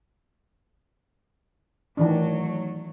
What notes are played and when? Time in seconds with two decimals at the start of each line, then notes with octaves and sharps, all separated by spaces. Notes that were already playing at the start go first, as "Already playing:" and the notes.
1.97 D#3 E3 F#3 A3 D4